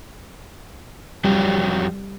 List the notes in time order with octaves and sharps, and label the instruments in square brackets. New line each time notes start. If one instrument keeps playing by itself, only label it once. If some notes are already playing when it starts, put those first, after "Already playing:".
[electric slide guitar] F2 F#3 G4 [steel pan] G3